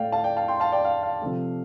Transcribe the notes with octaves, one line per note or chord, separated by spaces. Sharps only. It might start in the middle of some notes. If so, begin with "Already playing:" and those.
Already playing: A2 A3 D5 F5 G5
F5 A5
D5 G5
F5 A5
G5 C6
F5 A5
D5 G5
F5
F5
C3 F3 A3